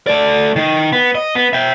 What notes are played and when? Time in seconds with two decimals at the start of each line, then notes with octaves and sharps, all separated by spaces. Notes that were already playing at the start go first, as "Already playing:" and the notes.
0.07 A3 D5
0.56 D#3
0.92 B3
1.15 D#5
1.35 B3
1.53 E5 G5